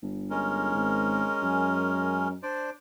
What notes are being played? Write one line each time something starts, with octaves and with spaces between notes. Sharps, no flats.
G1
G#3 C#4 A#4
G#1
F#2
D4 C5 D5